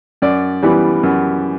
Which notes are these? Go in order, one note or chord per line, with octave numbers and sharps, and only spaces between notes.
F#2 D5
E3 G3 B3
F#2